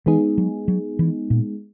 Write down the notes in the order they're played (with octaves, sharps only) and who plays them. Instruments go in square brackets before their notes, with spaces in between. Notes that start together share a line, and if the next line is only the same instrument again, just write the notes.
[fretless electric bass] E3 [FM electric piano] G#3 B3 D#4 G#4
[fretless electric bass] F#3
F#3
E3
A#2